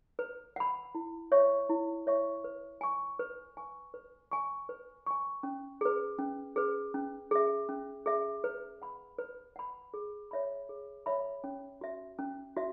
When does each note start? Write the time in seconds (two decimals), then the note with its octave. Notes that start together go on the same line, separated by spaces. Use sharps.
0.19 B4
0.56 F#5 B5
0.95 E4
1.32 C#5 E5 C#6
1.69 E4
2.07 C#5 E5 C#6
2.44 B4
2.81 G#5 C#6
3.19 B4
3.57 G#5 C#6
3.94 B4
4.32 G#5 C#6
4.69 B4
5.06 G#5 C#6
5.43 C#4
5.81 G#4 B4
6.18 C#4
6.56 G#4 B4
6.94 C#4
7.31 G#4 E5
7.69 C#4
8.06 G#4 E5
8.44 B4
8.82 F#5 B5
9.18 B4
9.56 F#5 B5
9.94 G#4
10.31 C#5 E5 B5
10.69 G#4
11.06 C#5 E5 B5
11.44 C#4
11.81 F#4 E5
12.18 C#4
12.57 F#4 E5